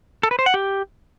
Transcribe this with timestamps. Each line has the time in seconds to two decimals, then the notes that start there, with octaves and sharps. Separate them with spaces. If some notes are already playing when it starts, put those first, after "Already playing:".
0.23 A4
0.31 B4
0.39 C5
0.46 F#5
0.54 G4